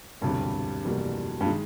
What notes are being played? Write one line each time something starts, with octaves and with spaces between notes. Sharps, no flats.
E1 D2 G2 C3
F1 E2 B2 G3 A#3
G2
D#3 G#3